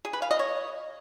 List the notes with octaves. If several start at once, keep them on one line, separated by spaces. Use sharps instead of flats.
G#4
B4
F5
D#5
C#5